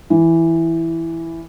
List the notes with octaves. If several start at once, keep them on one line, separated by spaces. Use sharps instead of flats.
E3